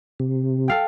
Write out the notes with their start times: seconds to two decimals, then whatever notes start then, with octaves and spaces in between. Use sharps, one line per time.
0.20 C3
0.68 A4 F5 G5